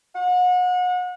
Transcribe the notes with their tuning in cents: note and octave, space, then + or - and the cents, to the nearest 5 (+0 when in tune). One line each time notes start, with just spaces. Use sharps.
F#5 -35